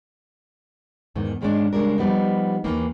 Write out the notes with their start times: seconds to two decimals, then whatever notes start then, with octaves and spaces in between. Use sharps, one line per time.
1.15 E2 G#2 D#3
1.41 G#2 D#3 G#3 C#4 D4
1.73 C#3 G3 G#3 D4 A#4
1.98 F3 G3 B3 D#4
2.64 D#2 D#3 E3 A#3